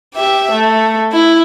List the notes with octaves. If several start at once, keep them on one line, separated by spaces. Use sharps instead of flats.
G4 E5
A3
E4